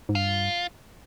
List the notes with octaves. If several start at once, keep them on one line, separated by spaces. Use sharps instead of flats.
G#2
G2 F4